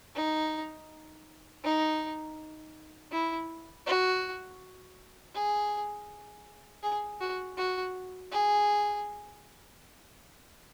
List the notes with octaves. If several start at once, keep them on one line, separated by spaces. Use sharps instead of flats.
D#4
D#4
E4
F#4
G#4
G#4
F#4
F#4
G#4